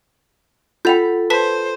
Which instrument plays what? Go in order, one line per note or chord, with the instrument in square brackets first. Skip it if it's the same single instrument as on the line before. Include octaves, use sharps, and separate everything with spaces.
[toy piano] F4 F#5 G5 [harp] A4 B5 [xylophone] G6 F7
[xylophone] B4 A5 B6 [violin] C5